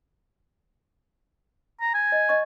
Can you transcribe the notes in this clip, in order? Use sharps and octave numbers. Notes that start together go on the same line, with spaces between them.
A#5
G#5
D#5
D#5 C#6